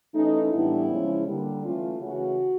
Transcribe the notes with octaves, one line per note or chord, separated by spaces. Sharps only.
E3 A3 C#4 D#4
A2 E3 G3 B3 D4 E4
C#3 F3 G#3 C#4
D3 G3 A#3
E3 A3 C#4 F4
C#3 E3 A3 C#4 F#4